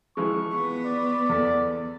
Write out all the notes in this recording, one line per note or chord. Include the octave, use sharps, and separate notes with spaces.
E3 F3 G#3 C#6
B3
D5
E2 A4